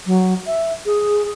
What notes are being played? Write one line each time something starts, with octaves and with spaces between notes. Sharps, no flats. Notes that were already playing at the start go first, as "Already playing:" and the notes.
F#3
E5
G#4